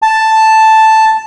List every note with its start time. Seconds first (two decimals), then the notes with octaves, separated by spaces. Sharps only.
0.02 A5